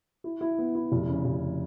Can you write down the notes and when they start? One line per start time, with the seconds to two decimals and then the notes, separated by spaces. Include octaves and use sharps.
0.24 E4
0.41 E4
0.59 B3
0.75 E4
0.92 F1
1.09 C#3
1.25 F1